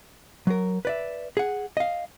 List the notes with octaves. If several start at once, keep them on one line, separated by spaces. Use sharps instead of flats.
F#3 A#4
B4 D5 E5
G#4 F#5
D#5 F5